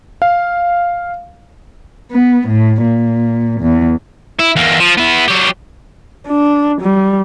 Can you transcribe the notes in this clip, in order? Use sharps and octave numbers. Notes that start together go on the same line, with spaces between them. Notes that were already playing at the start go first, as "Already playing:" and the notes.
F5
B3
A2
A#2
E2
E4
E2 A#3
F3
B3 E4
F#3 G4
D4
G3